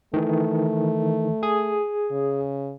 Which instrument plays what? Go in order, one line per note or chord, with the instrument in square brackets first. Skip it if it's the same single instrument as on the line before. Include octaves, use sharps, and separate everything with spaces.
[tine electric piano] D#3 E3 [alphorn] A3
[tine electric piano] G#4 D#6
[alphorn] C#3